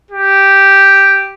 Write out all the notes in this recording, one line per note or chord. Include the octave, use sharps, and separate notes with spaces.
G4